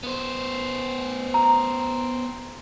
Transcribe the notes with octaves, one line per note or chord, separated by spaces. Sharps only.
B3 C5
A#5